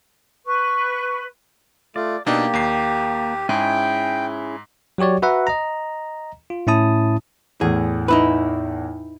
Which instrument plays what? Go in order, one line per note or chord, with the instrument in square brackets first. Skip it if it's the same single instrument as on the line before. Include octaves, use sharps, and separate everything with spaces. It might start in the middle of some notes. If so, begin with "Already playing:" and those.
[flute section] B4 C#6
[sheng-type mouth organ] A3 F4 [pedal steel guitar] D5
[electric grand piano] B2 D4 D#4 [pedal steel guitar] A#3 D5 [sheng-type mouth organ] G4
[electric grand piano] D#2 C7
[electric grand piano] G#2 [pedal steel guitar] C#4 E4 G#4 [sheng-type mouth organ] G5
[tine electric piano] F#3 F#4 G4 C#5 D5
F#4 B4 E5 F#5 A#5
D#5 A#5
F4
A2 C#4 E4 A5 D#6
[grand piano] E2 A2 [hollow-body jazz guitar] G#4
[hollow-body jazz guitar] D#4 E4 B4